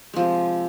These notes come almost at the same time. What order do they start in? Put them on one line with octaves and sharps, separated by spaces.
G#3 F3 C3